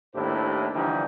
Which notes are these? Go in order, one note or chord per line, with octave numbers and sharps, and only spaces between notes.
D#2 A2 D4 E4 G4 C5
D3 E3 F3 G3 D4 D#4